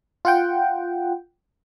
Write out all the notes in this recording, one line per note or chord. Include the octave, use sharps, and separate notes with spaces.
F4 F#5 G5